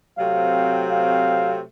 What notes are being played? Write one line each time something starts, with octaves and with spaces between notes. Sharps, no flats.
C3 F#3 A3 C4 F5
F5